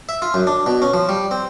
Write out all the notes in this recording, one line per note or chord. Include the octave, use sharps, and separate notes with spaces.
E5
F4
F#2
D4
B2
C#4
F3
G3
C4